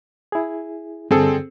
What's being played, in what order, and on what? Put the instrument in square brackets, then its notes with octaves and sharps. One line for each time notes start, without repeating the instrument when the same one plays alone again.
[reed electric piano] E4 G#4
[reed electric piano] G2 D3 [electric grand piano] C4 G#4 A4